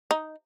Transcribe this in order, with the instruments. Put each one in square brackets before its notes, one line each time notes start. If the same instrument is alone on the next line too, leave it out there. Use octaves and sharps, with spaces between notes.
[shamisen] D#4